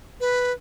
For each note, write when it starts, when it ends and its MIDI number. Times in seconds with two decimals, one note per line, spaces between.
0.20 0.52 71